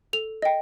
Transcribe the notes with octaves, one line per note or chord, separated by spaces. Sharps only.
A4 F7
D#5 G5